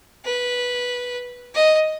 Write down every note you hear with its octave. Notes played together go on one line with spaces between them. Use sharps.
B4
D#5